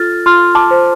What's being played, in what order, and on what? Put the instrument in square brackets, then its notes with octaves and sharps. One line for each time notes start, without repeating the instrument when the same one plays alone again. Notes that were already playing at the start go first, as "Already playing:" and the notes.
Already playing: [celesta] F4 A4 F6 A6
F4 C6 F6
A5 D6
C5